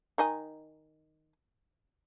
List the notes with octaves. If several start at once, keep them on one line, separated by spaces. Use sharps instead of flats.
D#3 D#4 G#5